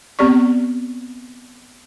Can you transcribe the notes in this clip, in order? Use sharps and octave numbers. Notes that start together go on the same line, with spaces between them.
B3 C4 G4 D5 C#6